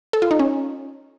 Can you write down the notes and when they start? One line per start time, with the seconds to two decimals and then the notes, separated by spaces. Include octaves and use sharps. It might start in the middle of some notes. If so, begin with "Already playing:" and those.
0.13 A4
0.22 F4
0.31 D#4
0.39 C#4